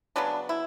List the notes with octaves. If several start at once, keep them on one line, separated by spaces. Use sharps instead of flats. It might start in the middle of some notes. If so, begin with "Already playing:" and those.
C#3 F#3 B3 D4
E4